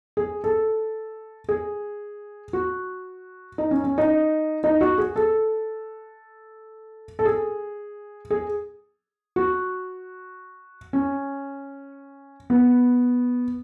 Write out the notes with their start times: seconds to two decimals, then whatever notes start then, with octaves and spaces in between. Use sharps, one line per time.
0.17 G#4
0.44 A4
1.49 G#4
2.53 F#4
3.58 D#4
3.71 C#4
3.84 C#4
3.98 D#4
4.64 D#4
4.81 F#4
4.98 G#4
5.16 A4
7.19 A4
7.25 G#4
8.30 G#4
9.36 F#4
10.93 C#4
12.50 B3